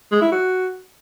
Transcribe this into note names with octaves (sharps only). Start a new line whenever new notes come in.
G#3
E4
F#4